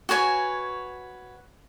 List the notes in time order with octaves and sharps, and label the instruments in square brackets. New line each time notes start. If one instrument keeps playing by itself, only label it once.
[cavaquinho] F#4 B4 C#5 G#5